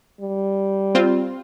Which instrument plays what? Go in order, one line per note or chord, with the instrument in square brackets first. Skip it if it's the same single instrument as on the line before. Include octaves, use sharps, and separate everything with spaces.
[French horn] G3
[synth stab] C4 F4